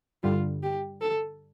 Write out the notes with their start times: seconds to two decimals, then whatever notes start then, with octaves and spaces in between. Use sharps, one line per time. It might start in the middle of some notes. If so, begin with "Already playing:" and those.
0.23 G2 D3 G3 F4
0.63 G4
1.01 A4